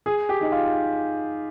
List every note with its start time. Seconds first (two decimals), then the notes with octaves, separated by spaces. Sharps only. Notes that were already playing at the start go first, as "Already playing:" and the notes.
0.06 G#4
0.29 G4
0.41 D#4
0.52 F4